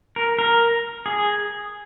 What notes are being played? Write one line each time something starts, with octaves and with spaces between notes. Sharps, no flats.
A#4
A#4
G#4